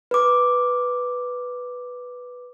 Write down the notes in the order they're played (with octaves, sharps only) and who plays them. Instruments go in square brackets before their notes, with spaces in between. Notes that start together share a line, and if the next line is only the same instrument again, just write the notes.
[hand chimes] B4 D6